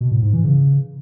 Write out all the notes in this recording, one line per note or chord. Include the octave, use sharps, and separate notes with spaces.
B2
A2
G#2
E3
C#3